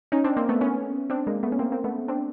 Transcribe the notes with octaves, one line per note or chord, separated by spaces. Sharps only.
C#4 D#4
C4 D4
A#3 C4
A3 B3
B3 C#4
C4 D4
G#3 A#3
A3 B3
C#4
A#3 C4
A#3 C4
A3 B3
C4 D4